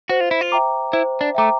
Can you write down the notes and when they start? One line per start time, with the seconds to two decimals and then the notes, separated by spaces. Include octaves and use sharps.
0.09 F#4 C5
0.21 F4
0.31 E4
0.41 F4
0.52 E5 G5 A#5 D6
0.93 E4 C5
1.21 D4
1.35 A3 E5 G5 A#5 D6